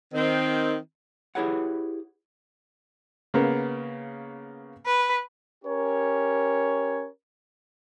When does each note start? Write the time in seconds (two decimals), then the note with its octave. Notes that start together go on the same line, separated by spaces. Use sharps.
0.13 D#3 C4
1.35 E4 G4 G#4 B4 C#5 F#5
3.34 C#3 A#3 B3
4.86 B4
5.65 C#4 G4 A#4 C#5